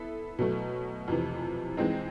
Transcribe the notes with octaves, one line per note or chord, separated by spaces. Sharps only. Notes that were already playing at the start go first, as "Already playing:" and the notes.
Already playing: B3 E4 A4
B2 F#3 A3
F2 C3 E3
E3 G#3 C4 D#4